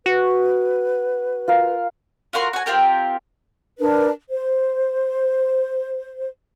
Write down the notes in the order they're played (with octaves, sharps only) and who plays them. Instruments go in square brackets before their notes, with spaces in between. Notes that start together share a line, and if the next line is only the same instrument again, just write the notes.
[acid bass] F#4 [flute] B4
[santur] F4 A#4 F5
[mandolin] F4 F#4 A#4 C6
F#4 G#5
C4 F4 G4 A#4
[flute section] D4 A#4 B4
C5